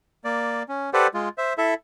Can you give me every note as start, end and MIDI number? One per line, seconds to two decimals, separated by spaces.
0.25 0.63 58
0.25 0.63 74
0.69 0.90 61
0.93 1.07 67
0.93 1.07 69
0.93 1.07 71
0.93 1.07 72
0.93 1.07 74
0.93 1.07 78
1.14 1.29 56
1.14 1.29 65
1.38 1.53 72
1.38 1.53 76
1.58 1.74 64
1.58 1.74 69
1.58 1.74 76